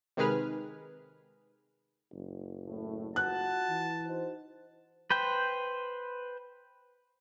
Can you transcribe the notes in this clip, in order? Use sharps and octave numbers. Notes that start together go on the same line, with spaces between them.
C3 D#3 G#3 G#4 B4 F6
F#1
A2
F4 F#4 F#5 A5 F#6
E3
D#4 F#4 C5
B4 C5 G5